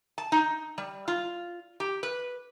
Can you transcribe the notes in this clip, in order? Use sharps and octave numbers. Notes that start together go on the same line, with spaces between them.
A5
D#4
G3
F4
G4
B4